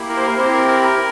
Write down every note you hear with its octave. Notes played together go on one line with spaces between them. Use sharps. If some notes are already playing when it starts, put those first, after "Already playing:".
Already playing: A#3 E4 G4
A#4
C5
A#4
C4 E4 G4 C5
A#4
A#4
A#4